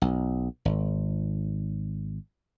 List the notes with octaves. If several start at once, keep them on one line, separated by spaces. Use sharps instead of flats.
B1
G#1